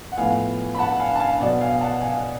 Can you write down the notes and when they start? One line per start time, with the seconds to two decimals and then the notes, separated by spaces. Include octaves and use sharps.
0.12 F#5
0.17 A2 F3 B3 F5 G#5
0.75 B5
0.79 F#5 A5
0.99 F5 G#5
1.16 A5
1.20 F5 G#5
1.40 B2 F#3 B3 D5 F#5
1.61 F5 G#5
1.81 F#5 A5
2.01 F5 G#5